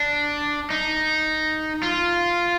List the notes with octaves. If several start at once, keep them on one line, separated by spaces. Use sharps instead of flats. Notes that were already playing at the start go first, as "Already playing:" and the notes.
Already playing: D4
D#4
F4